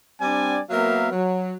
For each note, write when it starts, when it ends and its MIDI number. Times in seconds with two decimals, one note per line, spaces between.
0.21 0.59 55
0.21 0.59 60
0.21 0.59 62
0.21 0.59 74
0.21 0.59 80
0.70 1.09 54
0.70 1.09 58
0.70 1.09 59
0.70 1.09 70
0.70 1.09 76
0.70 1.09 77
1.12 1.55 54